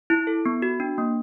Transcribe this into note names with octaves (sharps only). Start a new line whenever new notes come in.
E4
A4
B3
F#4
D4
A#3